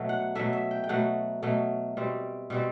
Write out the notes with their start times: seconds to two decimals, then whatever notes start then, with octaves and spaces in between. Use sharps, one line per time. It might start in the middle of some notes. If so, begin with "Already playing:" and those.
Already playing: B2 F#3 A3
0.09 F#5
0.35 B2 F#3 A3 E5
0.53 E5
0.71 G5
0.84 G5
0.89 B2 F#3 A3 F#5
1.43 B2 F#3 A3
1.97 B2 G3 C4
2.50 B2 G3 C4